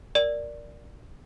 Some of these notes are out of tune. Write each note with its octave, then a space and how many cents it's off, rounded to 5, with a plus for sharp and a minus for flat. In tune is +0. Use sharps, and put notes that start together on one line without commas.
A#4 +0 D5 +0